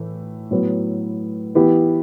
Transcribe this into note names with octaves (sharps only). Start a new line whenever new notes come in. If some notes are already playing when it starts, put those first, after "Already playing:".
Already playing: A2 E3 A3
A2 F#3 B3
E3 B3 E4 G4